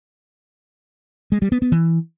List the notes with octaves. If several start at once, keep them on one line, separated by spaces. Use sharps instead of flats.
G#3
G3
B3
B3
E3